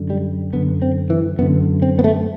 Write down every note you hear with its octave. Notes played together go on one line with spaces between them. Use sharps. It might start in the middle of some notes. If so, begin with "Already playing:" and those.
Already playing: F#2 D3
G3
F#2 D3 B3
C4
E3
F#2 D3 B3
C4
B3
A3